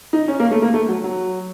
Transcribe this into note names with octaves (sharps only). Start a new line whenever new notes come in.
D#4
C#4
A#3
A3
A#3
A3
F#3
F#3